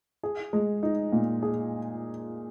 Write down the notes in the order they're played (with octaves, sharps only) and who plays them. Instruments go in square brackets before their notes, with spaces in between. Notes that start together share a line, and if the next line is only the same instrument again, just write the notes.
[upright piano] G#4
G#3
D#4
A#2
G#4